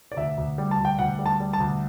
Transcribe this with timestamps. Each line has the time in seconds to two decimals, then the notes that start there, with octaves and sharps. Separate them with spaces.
0.12 D5
0.16 D2 E5
0.38 D2
0.58 G3
0.71 A5
0.79 D2
0.85 G5
0.99 D2 F#5
1.19 G3
1.26 A5
1.40 G3
1.53 A5
1.60 D2